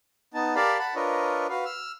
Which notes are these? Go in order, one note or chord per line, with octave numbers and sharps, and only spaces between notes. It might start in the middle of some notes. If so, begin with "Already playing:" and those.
B3 D#4 A5
G4 A#4 D5 F5 A5 B5
F#5 A5 B5
D4 F4 A#4 B4 C#5 D#5
F#4 B4 F5
E6 F6